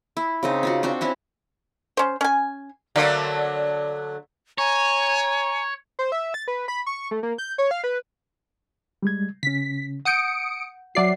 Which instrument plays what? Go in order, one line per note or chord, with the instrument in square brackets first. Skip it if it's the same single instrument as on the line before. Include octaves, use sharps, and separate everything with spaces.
[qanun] E4
C#3 C4 D#4
C#4 F4 F#4
C4 D4 F#4 C5
C4 C#4 E4 E5
[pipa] C#4 C5
C#4 G#5
[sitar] D3 F#3 A3 [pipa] A#3
[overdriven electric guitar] C#5 [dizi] G#5 [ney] A#5
[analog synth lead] C5
E5
A6
B4
B5
C#6
A3
A#3
G6
C#5
F5
B4
[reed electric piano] G3 G#3 G#6
[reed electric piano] C#3 C#4 [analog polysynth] B6
[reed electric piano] F#5 G6 [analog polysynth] D#6 C#7 D7
[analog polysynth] F#3 D5 C7 [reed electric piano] F#4 E5 F#5